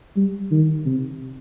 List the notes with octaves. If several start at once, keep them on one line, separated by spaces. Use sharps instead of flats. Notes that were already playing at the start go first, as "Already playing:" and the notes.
G3
D#3
C3